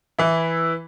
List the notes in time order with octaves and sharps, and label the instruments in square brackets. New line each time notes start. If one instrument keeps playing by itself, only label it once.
[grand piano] E3 E4